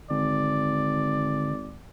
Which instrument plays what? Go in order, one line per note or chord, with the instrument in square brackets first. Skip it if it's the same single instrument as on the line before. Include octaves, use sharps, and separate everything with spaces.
[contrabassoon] G#1 [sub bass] D3 [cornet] D5